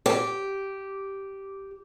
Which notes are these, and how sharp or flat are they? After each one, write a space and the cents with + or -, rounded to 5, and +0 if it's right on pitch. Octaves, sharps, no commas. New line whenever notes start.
G4 -10